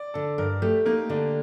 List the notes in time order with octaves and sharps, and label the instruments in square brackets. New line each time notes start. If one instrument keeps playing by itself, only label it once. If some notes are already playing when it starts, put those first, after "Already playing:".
Already playing: [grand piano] D5
[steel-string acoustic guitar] D3 [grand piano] A4
[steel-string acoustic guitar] G2 [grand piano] A#4
[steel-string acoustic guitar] A3 [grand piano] G4
[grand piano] A#3 [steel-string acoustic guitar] D#4
[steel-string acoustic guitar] D3 [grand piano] D4